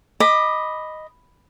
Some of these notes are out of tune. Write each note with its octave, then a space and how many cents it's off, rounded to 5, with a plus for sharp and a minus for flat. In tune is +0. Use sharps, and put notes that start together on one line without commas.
D#5 +0 B5 +0 D6 +20